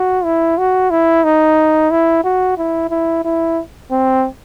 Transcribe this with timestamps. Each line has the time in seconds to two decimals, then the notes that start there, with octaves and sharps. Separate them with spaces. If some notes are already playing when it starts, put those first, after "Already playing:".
Already playing: F#4
0.25 E4
0.58 F#4
0.91 E4
1.24 D#4
1.91 E4
2.24 F#4
2.58 E4
2.90 E4
3.25 E4
3.91 C4